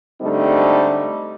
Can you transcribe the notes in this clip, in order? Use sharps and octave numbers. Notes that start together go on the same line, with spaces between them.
G#2 D3 G3 A3 C4 D#4